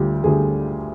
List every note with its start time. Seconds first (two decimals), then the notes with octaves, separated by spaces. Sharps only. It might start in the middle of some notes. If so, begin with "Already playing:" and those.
Already playing: D2 D3 G3 F4 G4
0.24 D2 D3 G3 G#4